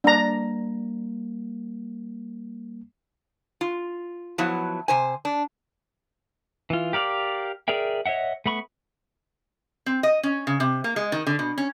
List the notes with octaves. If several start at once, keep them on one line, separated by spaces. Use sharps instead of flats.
G3 A#3 D4 A#5
F4
F3 F#3 B3 E4
C3 C5 G#5
D4
E3 F4
G4 A#4 D5 F5 D6
G#4 A#4 D5 E5 G5
C#5 D#5 E5 F#5
A3 B3 B5 C#6
C4
D#5
C#4
C#3
C3
A#3
G#3
D#3
D3
B2
C#4